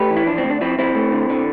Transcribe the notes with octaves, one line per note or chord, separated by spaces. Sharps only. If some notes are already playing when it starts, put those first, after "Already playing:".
Already playing: A3 G4 B4
E3
E4
F3 D4
C4
D2
D4
F3 C4 E4
F3 C4 E4
A3
D3
D3